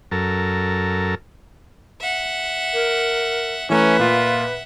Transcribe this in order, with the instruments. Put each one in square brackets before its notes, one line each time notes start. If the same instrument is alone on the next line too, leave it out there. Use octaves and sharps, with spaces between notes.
[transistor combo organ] F#2 A4 A#4
[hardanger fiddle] E5 F#5
[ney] A#4
[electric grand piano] E3 A3 A#5 [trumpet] C#4 [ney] B4 [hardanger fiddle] E5 F#5
[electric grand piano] A#2 [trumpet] F4